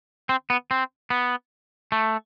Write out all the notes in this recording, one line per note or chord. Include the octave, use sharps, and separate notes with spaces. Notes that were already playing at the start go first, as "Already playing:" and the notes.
C4
B3
C4
B3
A3